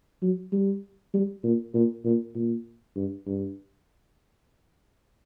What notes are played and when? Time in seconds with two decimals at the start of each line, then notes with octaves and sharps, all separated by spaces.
0.22 F#3
0.52 G3
1.14 G3
1.44 A#2
1.74 A#2
2.05 A#2
2.35 A#2
2.96 G2
3.27 G2